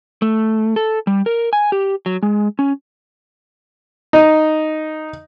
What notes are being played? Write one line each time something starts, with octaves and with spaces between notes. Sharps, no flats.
A3
A4
G3
A#4
G#5
G4
F#3
G#3
C#4
D#4